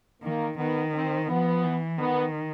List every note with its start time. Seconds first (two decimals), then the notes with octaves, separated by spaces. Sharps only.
0.23 D#3 A#3
0.58 D#3 B3
0.94 C4
1.28 F3 B3
1.64 E3
1.98 D#3 B3